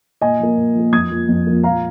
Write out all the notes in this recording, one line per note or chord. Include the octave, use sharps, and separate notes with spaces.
A#2 D#5 G#5
F3 A#3
A#2
F3 A#3
F2 D#6 G#6
F3 A#3
F2
F3 A#3
A#2 F5 A#5